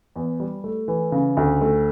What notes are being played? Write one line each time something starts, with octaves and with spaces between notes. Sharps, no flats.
E2
G3
A3
E3
C#3
D2
A3